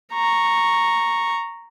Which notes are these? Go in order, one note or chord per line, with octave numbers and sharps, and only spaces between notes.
A#5 C#6